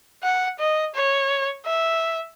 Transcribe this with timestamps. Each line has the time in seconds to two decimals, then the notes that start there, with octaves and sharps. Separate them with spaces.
0.23 F#5
0.59 D#5
0.94 C#5
1.65 E5